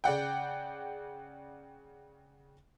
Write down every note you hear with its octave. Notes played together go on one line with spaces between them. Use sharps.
C#3 D5 F#5 G5